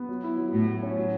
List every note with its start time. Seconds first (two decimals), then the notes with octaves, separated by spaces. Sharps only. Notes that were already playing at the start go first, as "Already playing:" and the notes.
Already playing: B3
0.09 F#3
0.23 E4
0.37 F#3
0.52 A2 F#3
0.67 F#3
0.83 C#4
0.97 F#3